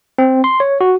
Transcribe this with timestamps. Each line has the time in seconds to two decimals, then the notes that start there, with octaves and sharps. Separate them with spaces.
0.18 C4
0.44 C6
0.60 C#5
0.81 F#4